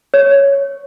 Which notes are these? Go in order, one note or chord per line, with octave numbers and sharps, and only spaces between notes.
C#5